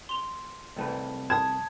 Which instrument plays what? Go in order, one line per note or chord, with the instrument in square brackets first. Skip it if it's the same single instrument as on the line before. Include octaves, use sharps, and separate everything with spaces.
[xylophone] C6 F7 G7
[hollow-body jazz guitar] C2 A3 B4
[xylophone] A5 D#6 [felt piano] G#6